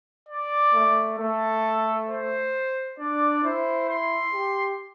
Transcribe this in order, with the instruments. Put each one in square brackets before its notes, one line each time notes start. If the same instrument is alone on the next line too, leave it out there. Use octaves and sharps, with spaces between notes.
[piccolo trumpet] D5
[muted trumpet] A3
[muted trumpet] A3 [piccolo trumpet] A4
[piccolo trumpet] C5
[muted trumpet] D4 [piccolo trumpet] D5
[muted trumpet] E4 [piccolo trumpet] C5
[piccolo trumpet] C6
[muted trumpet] G4